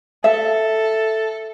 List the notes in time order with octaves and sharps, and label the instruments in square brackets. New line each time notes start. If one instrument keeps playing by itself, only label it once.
[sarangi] A4 [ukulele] E5